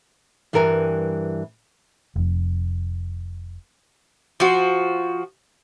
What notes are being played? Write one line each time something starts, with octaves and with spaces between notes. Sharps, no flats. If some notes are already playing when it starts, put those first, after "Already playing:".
G2 E3 G3 A#4 G5 G#5
F1 F2
F3 F#4